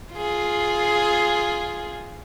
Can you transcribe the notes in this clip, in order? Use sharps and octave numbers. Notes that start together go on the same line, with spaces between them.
F4 G#4